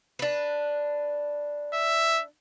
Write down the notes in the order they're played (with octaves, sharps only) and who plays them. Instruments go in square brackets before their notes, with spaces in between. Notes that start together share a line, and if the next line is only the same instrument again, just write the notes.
[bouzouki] D4 B4
[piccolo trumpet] E5